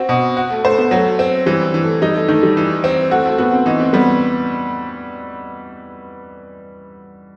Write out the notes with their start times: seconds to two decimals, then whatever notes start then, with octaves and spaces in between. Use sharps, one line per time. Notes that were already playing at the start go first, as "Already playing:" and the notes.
Already playing: C4 F#4
0.09 B2
0.37 F#4
0.50 A3
0.64 A3 C5
0.78 B3
0.91 F#3 A3
1.19 C4
1.46 E3 G3
1.74 E3
1.83 A3
2.02 G3 D#4
2.16 A3
2.28 D#3 A3
2.43 G3
2.57 E3
2.84 C4
3.11 A3 F#4
3.25 A3
3.38 B3 F#4
3.53 C4
3.66 E3 D#4
3.80 C4
3.93 G3 B3